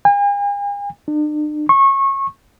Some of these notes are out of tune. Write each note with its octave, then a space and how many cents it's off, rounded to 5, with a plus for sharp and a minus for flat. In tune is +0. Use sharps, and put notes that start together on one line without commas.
G#5 -45
D4 +45
C#6 -25